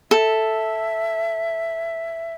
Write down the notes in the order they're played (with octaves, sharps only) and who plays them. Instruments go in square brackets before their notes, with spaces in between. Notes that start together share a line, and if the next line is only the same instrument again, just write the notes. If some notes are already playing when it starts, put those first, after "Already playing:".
[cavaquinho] A4 [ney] E5